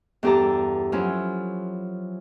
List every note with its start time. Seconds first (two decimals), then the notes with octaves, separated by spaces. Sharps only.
0.23 E2 G2 G4 A4 A#5
0.92 F3 F#3 C#4 E4